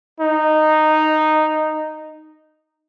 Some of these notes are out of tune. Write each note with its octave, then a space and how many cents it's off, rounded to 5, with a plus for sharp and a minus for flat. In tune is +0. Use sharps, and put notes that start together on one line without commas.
D#4 -10